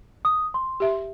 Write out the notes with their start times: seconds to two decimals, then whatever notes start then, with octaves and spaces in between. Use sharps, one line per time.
0.25 D#6
0.54 C6
0.80 G4 E5